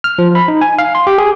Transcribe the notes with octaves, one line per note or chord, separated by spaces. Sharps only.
F6
F3
B5
D#4
G#5
F5
C6
G4
G#4